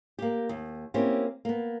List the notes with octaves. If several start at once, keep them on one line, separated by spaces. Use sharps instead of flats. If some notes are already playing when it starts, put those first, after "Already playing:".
A#3 G4
D#2
A#3 C4 C#4 E4 G4
A#3 B3